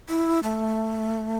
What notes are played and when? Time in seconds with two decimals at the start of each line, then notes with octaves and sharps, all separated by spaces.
0.09 E4
0.43 A3